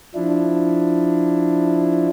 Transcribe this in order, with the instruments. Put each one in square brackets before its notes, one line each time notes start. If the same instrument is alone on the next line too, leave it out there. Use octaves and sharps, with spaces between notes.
[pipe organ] F3 D4 E4